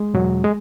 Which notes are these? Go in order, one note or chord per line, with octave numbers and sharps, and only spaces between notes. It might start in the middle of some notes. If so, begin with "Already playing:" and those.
Already playing: G#3
E2 B2 F#3
G#3